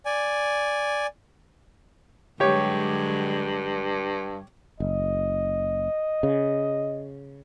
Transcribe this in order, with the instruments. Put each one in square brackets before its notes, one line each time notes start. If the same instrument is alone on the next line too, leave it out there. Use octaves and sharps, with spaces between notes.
[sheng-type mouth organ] D5 G#5
[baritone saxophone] G2 [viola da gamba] D3 F#3 G#3 [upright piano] G4 C#5
[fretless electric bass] F#1 [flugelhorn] D#5
[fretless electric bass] C#3